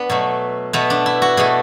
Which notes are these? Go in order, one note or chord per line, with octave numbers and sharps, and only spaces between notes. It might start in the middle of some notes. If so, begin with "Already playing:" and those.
Already playing: B3 D4
B2 F#3 A3
B2 A3 B3
D4
E4
F#4
B2 A3 G#4